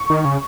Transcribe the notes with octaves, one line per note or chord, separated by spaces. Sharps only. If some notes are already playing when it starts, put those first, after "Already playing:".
Already playing: C#6
D#3
C#3